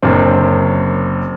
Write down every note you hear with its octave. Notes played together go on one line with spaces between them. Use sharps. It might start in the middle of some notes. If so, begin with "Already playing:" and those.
F#1 F#2 D3 C4